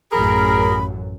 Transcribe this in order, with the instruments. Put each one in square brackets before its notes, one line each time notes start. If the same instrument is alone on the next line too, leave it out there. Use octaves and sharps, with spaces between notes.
[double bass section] A1 F#2 [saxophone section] G#4 A#4 [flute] B5